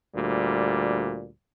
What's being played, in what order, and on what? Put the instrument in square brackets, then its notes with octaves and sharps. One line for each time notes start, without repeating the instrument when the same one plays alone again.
[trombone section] D2 A#2 G3